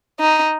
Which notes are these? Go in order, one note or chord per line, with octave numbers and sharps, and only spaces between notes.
D#4